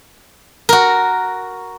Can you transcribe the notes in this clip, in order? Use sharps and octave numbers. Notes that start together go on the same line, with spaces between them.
F#4 A#4